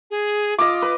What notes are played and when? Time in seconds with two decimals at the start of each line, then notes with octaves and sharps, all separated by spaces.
0.11 G#4
0.58 F4 D#5 D6
0.82 B4